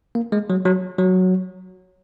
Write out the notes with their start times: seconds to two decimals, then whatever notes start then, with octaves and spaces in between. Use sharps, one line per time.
0.15 A#3
0.32 G#3
0.50 F#3
0.65 F#3
0.98 F#3